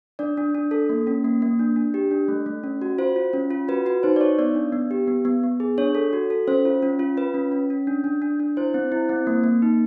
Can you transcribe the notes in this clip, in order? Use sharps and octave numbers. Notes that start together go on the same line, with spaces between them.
D4 D5
D4
D4
A4
A#3
C#4
A#3
A#3
D4
D4
G4
D4
A3
A3
C#4
F#4
F4 C5
F4
C#4
F4
F#4 B4
F#4 B4
D#4 C5
D5
D#4 C#5
B3 D5
D4
B3
G4
B3
B3
B3
G#4
D4 C#5
A4
F#4
A4
C#4 C5
F4
C#4
F4
F4 B4
C#4
C#4
C#4
D4
D4
D4
D4
E4 C5
C4
E4
C4
A#3
A#3
D#4